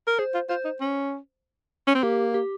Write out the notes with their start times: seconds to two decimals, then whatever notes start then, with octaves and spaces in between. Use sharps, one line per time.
0.07 A#4
0.19 G#4 C5
0.34 F4
0.49 F4 C5
0.65 D#4
0.81 C#4
1.87 C#4
1.95 C4
2.03 A#3 G4
2.34 G4